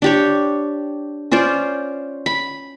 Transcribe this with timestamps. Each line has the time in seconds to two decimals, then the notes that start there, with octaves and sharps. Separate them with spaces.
0.02 D4 G4 C#5
1.32 C#4 F4 C5 D5
2.26 B5